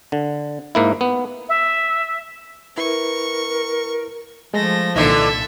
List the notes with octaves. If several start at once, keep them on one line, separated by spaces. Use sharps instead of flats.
D3
G#2 A#3 E4
B3
E5
E4 A#4 B4 C#6
F3 G#3 A3 A#6
C2 A#2 D3 E3 D#4 A4 E5